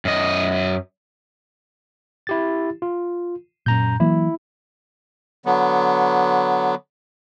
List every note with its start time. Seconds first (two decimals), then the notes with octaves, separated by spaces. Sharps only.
0.05 F#2 D#5
2.27 E4 G4 A6
2.82 F4
3.66 F#2 A#2 A#5 G6
4.00 E3 F#3 A#3 E4
5.46 D3 F#3 B3